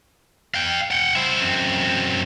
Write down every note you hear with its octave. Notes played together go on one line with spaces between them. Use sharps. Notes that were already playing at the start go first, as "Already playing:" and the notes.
F5 G5
F#5 G5
E4 C5
F#2 C4